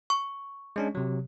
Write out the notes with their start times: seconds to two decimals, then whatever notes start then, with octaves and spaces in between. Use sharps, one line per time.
0.10 C#6
0.76 G#3 C#4 D4
0.95 C3 F#3